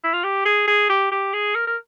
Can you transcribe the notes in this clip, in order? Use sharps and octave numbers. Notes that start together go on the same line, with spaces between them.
E4
F4
G4
G#4
G#4
G4
G4
G#4
A#4
A#4